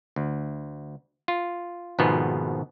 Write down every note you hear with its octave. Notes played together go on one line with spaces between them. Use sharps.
D2
F4
G#1 G#2 B2 F3 A3 B3